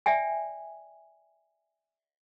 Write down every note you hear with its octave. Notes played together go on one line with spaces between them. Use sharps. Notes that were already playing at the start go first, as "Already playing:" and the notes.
D5 E5 G5 G#5